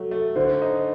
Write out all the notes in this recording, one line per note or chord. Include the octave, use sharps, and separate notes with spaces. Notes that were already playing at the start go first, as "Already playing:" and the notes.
Already playing: F#3 A3
A3
D3 C5
D#4